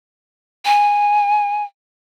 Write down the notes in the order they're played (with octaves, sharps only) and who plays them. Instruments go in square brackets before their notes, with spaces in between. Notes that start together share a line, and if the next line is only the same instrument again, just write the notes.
[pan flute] G#5